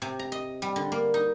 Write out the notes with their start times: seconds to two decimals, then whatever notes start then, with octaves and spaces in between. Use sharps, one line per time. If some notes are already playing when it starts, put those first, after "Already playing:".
0.02 C3
0.19 A#5
0.32 D#5
0.62 G3
0.76 D3
0.92 A#3
1.14 D#4